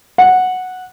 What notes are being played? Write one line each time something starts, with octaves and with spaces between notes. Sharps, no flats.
F#5